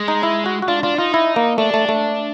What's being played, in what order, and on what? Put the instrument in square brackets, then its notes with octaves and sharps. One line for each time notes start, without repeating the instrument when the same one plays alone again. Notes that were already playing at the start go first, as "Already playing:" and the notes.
Already playing: [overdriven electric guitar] G#3
[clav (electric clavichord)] D#4
E4
F#4
F#4
[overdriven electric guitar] D4 [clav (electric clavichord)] F4
[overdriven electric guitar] D4 [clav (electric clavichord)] F4
[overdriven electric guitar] D#4 [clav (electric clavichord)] F4
[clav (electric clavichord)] E4
A#3
[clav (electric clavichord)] A3 [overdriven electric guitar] D4
[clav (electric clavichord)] A3
A3